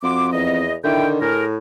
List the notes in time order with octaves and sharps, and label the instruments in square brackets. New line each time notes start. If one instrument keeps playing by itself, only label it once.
[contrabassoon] F2 [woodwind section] F#4 C6 D6
[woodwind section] E2 D#5
[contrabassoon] D3 [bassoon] D#3 [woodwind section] E4 G5
[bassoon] A2 [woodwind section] G#4 A#4